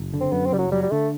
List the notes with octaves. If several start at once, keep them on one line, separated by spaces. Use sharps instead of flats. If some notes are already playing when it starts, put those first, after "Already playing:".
Already playing: F#1
D3
C4
F#2 B3
C4
F#1 G3
F#3
F#3 G3
G3
D3 A3